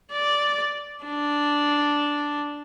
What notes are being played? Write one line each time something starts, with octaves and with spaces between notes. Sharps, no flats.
D5
D4